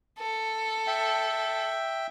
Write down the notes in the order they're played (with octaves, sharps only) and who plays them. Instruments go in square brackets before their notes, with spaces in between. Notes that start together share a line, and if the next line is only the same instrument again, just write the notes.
[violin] A4
[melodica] E5 G5